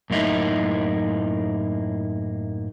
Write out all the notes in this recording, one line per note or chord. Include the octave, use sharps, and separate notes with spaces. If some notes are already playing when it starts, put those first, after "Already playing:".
F#2 A2 A#3 D#4 E4